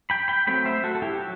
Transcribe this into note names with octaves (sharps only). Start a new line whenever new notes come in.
G5 B5
G5 B5
F#3 A3 C4 G5 B5
C5 E5
F#4 A4
A4
E4 G4
F#3